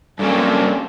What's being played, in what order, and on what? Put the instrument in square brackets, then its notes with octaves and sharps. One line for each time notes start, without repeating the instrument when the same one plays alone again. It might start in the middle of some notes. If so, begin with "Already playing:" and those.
[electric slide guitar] G2 F#3 A#3 [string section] C4 C#4 A4